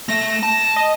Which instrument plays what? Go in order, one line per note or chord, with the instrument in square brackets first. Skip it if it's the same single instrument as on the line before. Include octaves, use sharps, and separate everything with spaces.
[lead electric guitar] A3 E5 [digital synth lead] A#6
[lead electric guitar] A5
[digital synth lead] D#5